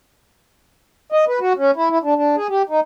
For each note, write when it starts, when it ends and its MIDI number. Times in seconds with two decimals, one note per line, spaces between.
1.12 1.25 75
1.28 1.39 71
1.40 1.53 66
1.57 1.71 61
1.76 1.90 64
1.90 1.98 64
2.03 2.15 62
2.16 2.36 62
2.36 2.47 68
2.49 2.62 67
2.69 2.80 63